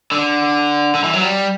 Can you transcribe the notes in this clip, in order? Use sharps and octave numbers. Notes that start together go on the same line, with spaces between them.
D3
D3
E3
F#3
G3